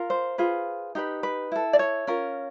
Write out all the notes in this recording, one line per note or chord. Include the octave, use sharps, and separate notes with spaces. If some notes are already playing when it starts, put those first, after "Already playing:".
Already playing: F4 A#4
C5
F4 G#4 B4
D#4 G4 B4
B4
E4 A4
D5
C#5
C#4 F4 A#4